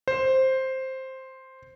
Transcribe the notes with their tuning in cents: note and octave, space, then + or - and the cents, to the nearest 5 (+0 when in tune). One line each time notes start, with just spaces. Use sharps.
C5 +5